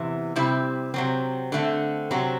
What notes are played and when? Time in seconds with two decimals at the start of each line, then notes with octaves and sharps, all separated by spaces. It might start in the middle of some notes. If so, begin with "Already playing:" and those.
Already playing: E2 C3 E3
0.36 C3 G3 C4 E4
0.94 C3 F#3 C4
1.52 D3 A3 C4
2.11 C3 F#3 C4